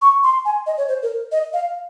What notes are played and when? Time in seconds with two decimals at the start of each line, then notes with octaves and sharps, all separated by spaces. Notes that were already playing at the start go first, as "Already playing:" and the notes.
0.02 C#6
0.23 C6
0.45 G#5
0.66 D#5
0.78 C#5
0.88 C5
1.03 A#4
1.32 D#5
1.53 F5